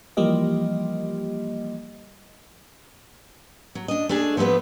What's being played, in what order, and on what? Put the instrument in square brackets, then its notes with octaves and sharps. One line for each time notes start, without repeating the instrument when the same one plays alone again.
[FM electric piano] E3 F3 G3 A#3 G4 D#5
[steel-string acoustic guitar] F#3
D4 D#5
A3 D4 G#4
F3 F#3 A3 B3 B4